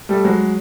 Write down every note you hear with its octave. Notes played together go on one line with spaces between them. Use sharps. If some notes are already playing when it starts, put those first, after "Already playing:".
G3 A3
F#3 G#3